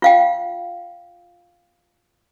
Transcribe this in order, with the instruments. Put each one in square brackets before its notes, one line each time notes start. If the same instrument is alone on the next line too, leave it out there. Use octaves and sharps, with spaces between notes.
[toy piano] F4 F5 G5